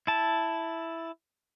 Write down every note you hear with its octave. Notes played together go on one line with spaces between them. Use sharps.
E4 A5